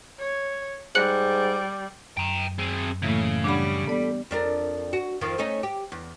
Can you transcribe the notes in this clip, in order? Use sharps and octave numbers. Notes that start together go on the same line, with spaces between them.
C#5
G#2 G3 F#6 C#7 F#7
F#2 G5 A#5
C4 G#4
A2 C#3 E3 A#3
G3 D4 F#5 B5
B3 A4 D5 B5
F2 D4 A#4
F#4
F2 D#3 F3
A3 C#4 D#4
G4
E2